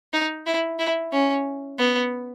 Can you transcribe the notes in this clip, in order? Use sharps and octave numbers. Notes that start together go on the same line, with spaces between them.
D#4
E4
E4
C#4
B3